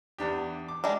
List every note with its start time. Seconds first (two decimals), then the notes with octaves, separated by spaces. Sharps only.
0.18 E2 D4 G4
0.68 D6
0.84 G3 G#3 D4